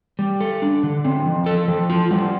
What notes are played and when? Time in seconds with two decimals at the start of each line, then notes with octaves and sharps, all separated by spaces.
0.19 G3
0.41 A4
0.62 D4
0.83 D3
1.05 C4
1.26 F3
1.46 A4
1.68 F3
1.90 F4
2.11 G3